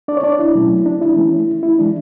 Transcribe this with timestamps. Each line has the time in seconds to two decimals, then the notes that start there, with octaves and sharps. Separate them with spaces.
0.08 D4 D5
0.17 C#5
0.23 D4 D5
0.39 E4
0.55 B2 F#3 A3 C#4
0.86 D4
1.01 E4
1.16 E3 A3 C#4
1.63 E4
1.79 E3 G#3 D4